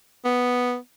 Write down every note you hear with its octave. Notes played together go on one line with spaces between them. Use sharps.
B3